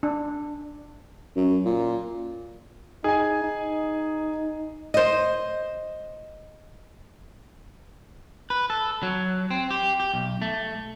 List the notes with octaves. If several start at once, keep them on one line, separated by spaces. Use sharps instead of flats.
D4
F#2
A#2
D#4 G#4 G#5
D#4
C5 D#5
B4
A4
F#3
C4
G4
G4
B1
A3